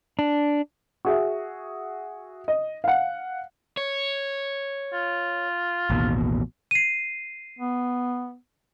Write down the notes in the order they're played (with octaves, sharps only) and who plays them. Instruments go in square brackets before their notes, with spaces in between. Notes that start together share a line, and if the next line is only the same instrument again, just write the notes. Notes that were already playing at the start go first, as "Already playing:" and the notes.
[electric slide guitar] D4
[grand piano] F#4 G#4 E5
D#5
F5 F#5
[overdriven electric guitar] C#5
[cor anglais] F4
[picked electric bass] A1 D#2 B2
[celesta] C7 D#7
[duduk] B3